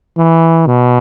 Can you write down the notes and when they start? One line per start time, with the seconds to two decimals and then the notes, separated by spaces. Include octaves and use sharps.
0.18 E3
0.66 B2